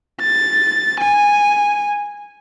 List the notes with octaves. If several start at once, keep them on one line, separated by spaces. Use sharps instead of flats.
A6
G#5